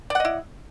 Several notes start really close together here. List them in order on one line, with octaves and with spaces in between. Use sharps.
D5 F#5 D#5 E4